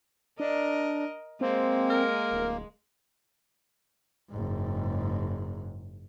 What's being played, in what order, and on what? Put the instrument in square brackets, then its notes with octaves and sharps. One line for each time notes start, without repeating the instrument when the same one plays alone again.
[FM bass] D4 [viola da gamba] A#4 D#5
[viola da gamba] G#3 [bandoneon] A#3 [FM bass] C4
[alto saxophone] A#4
[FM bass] D1
[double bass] F#1 G#2